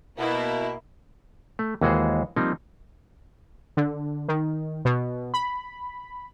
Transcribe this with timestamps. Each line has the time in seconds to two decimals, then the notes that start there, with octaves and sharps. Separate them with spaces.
0.18 B2 A#3 E4
1.59 A3
1.81 D#2 E3 G#3 F#4 G#4 C5
2.36 F3 G3 A#3 C4 D#4
3.77 D3
4.28 D#3
4.85 B2
5.34 B5